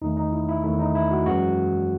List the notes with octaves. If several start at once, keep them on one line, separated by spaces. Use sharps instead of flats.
E2 D#3 A3 D#4
D#4
E4
E4
E2 D#3 A3 E4
D#4
E4
F#4
F#2 E3 G#3 F#4